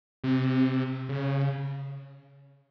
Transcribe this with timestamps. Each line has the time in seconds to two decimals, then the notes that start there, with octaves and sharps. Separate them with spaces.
0.24 C3
1.09 C#3